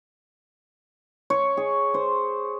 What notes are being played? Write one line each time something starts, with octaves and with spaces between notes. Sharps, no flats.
C#5
G#4
C5